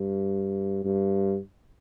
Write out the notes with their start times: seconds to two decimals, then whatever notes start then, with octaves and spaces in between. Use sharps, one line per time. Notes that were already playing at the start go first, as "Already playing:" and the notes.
Already playing: G2
0.84 G2